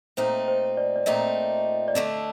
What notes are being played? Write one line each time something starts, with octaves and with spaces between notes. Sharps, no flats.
A#2 A3 C4 D#4 C5
C5
D5
D5
A#2 A3 C4 D#4 D#5
D5
D3 A3 D4 D#5